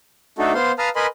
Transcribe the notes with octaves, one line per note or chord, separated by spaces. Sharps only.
A3 D4 D#4 F#4 A4
B3 C5 F5 C6
B4 F5 A5 A#5 D#6 F6
A#4 B4 D#5 G#5 B5 C6